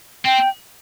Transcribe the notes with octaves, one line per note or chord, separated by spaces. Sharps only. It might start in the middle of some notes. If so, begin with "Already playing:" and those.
C4 G5